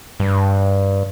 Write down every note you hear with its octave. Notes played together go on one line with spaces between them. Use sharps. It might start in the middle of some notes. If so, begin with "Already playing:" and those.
G2